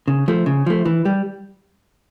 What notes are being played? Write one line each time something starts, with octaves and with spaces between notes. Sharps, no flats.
C#3
F3 A3
C#3
F3 A3
E3
G3